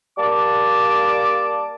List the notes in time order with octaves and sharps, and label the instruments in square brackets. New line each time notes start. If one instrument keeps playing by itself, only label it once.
[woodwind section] G3 A#3 A5 D6